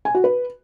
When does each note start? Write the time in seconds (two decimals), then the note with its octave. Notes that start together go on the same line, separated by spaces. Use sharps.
0.05 G#5
0.15 F#4
0.24 B4